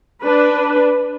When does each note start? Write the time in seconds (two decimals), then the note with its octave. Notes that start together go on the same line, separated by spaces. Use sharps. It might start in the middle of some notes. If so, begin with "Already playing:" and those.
0.22 D4 B4